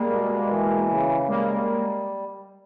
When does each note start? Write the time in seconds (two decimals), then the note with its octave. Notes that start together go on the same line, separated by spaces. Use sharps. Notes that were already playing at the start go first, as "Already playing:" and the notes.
Already playing: G3 G#3 A#3
0.11 B2
0.50 E3
0.89 C#3
1.28 G3 G#3 A#3